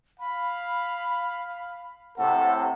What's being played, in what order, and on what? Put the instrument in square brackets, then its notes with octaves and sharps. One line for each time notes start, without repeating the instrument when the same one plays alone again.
[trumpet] F5 [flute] B5
[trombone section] A2 C3 [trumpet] A4 [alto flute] F#5